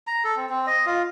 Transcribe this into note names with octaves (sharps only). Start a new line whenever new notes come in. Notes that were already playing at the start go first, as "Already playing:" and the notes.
A#5
A4
C4
C4
D#5
F4